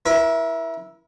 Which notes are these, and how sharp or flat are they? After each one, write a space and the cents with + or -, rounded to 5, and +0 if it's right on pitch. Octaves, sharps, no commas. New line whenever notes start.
E4 +0 A#4 +40